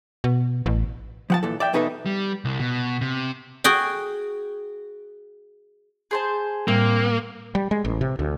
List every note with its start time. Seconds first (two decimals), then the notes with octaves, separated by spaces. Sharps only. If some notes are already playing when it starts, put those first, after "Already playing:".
0.24 B2
0.66 A1
1.30 F3 F#5 A5
1.43 A#2 E3 A4
1.60 D5 E5 G5
1.73 E2 B2 D#4 A4 B4 E5
2.06 G3
2.45 C2
2.60 B2
3.01 C3
3.64 F#4 G#4 G5
6.11 G#4 C5 A5
6.68 A2 G3 A#3 C4
7.55 G3
7.71 G#3
7.85 A1
8.01 C3
8.19 D2